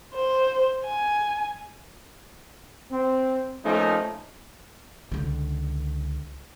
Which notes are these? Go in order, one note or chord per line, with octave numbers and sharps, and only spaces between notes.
C5
G#5
C4
F3 A3 A#3 C#4 D#4
C#2 D3